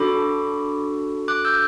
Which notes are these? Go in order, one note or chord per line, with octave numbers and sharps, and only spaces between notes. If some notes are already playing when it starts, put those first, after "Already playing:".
Already playing: D4 F#4 A4 B5 D6
D6 F#6
E6 G6